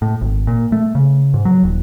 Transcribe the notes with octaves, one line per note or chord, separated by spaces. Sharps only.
A2
G#1
A#2
A3
C#3
G#2
F#3
D#1